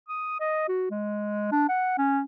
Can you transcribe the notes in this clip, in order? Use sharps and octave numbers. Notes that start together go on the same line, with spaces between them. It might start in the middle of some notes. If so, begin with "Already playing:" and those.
D#6
D#5
F#4
G#3
D4
F#5
C#4